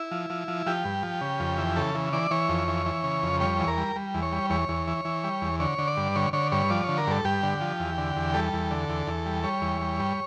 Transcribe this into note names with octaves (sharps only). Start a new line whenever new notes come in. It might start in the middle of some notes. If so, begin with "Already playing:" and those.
Already playing: E4
F3
F3
F3
F3 G4
G2
F3
C#3
F2
E3
C#3 A4
E3
E3 D5
E3 C#5
F2
E3
E3
C#3
F2
G3 C#5
E2
A#4
G3
G3
E2
C#5
G3
E2 C#5
E2
E3
E3
G3
E2
D3 C#5
D3
D5
G2
D3 C#5
D3 C#5
G2 C#5
F3 D5
D3 C#5
A#4
G2 A4
G2 G4
D3
F3
E2
D3
E2
G3 A4
E2
D3
E2
E2
G3
G3 C#5
E2
G3
G2